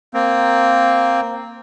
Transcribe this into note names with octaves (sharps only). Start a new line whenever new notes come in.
A#3 C4